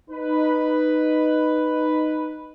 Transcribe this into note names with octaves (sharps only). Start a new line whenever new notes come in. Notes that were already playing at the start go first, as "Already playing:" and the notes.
D#4 B4